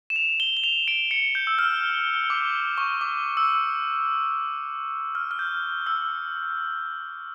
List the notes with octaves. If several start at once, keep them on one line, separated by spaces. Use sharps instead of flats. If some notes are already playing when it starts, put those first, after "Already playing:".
E7
F7
G7
G7
F7
D7
C#7
G6
E6
F6
D6
C#6
D6
E6
F6
F6
G6
E6